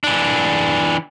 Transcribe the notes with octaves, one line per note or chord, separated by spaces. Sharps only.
E3 D4